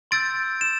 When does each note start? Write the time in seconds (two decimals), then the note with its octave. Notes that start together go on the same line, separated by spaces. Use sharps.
0.11 C6 E6 G6 A6 D7
0.61 E7